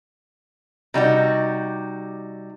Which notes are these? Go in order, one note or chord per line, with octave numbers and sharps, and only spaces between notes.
C3 G3 D#4 F#4